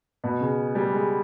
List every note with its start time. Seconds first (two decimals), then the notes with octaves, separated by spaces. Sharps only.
0.24 B2
0.40 C#3
0.75 G3
0.92 G#3